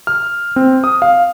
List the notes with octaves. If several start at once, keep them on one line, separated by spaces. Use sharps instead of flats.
F6
C4
D#6
F5